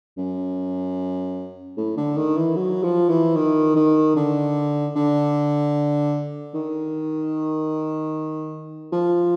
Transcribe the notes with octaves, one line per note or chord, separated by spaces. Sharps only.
F#2
A2
D3
D#3
E3
F#3
F3
E3
D#3
D#3
D3
D3
D#3
F3